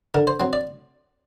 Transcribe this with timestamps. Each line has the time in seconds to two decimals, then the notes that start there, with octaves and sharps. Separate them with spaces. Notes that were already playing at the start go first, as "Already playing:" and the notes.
0.14 D3 A#4
0.27 C5
0.40 F#3 C4
0.53 D5